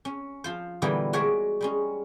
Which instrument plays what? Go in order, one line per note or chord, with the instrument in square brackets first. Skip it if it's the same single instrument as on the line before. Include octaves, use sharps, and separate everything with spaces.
[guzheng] C#4
F3 F4 C5
A#2 D3 E3 G3 B3 A#4
G#3 F#4 A#4 C#5 D5 E5
G3 G#3 C#4